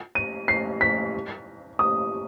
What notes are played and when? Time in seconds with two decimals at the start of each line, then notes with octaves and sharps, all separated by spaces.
0.15 D#7
0.48 C7
0.81 B6
1.79 D#6